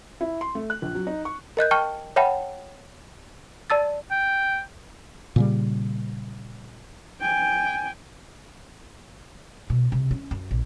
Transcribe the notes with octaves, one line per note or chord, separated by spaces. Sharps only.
E4
C6
A3
F#6
A#1
F#3
D#4
C#6
A#4 D#5 F#6 G6
G5 A5 C#6 F6
C#5 E5 F#5 G5 A5 B5
D5 A5 E6 A6
G5
A#2 C#3 G3
G5 G#5
B2
C3
C#4
F#2
A#1